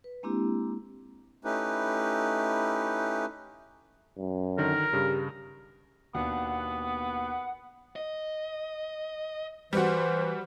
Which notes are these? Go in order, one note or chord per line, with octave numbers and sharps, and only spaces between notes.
B4
G#3 A#3 C4 D4 E4 G4
A3 C#4 D#4 E4 G4 B4
F#2
D3 D#3 A#4
G2 C#3 G4
D#2 B2 B3 D4 F#5
D#5
E3 G3 F#4 C5